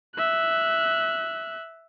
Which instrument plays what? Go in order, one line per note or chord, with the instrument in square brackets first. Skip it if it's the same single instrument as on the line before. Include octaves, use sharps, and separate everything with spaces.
[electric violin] E5 F#6